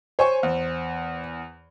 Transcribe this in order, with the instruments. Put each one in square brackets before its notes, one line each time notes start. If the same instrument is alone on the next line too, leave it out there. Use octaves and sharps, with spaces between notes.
[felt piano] C5 [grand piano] C#5 G#5 C#6
[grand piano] E2